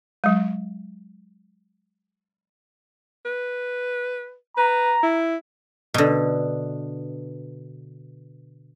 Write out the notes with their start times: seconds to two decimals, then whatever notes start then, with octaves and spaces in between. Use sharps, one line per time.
0.24 F#3 G#3
3.25 B4
4.57 B4 A#5
5.03 E4
5.94 B2 D3